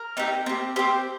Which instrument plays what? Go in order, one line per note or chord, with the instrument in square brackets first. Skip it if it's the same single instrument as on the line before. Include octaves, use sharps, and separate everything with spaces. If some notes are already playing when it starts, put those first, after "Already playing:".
Already playing: [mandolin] A#4
C4 D#4 G4
C4 G4
C4 G4 C5